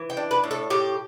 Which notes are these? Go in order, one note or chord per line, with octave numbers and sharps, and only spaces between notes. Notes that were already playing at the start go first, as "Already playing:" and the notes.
Already playing: E3
G5
D4
B4
A2
A4
A2 G4